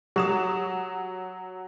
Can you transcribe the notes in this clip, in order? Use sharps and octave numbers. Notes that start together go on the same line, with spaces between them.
F#3 G4 D#6 E7